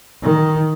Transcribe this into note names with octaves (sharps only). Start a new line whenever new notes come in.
D#3